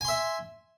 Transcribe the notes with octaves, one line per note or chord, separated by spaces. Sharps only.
E5 G#5 C6